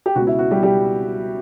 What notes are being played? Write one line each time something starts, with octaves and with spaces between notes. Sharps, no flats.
G4
C#2 B2 F#4
E4
F#4
G3 G4
B2 G3 G4